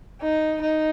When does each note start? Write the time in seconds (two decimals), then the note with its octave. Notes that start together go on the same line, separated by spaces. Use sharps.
0.22 D#4
0.62 D#4